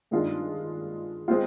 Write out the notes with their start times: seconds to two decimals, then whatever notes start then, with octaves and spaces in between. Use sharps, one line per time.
0.11 G2 D#3 G#3 D4 F4
1.28 G#3 C4 F4